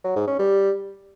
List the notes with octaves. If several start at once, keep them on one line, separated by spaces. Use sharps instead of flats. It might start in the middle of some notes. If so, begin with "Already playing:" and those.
F#3
G#2
C#4
G3